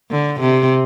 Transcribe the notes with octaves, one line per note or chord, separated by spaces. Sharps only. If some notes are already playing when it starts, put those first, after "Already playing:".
D3
C3